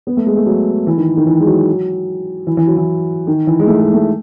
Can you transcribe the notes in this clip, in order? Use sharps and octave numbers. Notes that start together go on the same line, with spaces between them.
B3
A3
G#3
A3
F#3
E3
D#3
D#3
E3
G#3
F#3
E3
E3
F#3
E3
D#3
E3
G#3
A3
G#3
A3